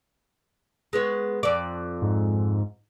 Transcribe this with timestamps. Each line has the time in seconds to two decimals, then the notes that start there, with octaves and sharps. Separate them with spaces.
0.93 G#3 B3 C#5
1.43 F2 D5
2.02 G#2